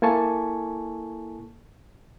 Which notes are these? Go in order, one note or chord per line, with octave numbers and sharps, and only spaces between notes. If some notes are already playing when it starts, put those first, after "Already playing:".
A#3 E4 A4 G#5 A5 C#6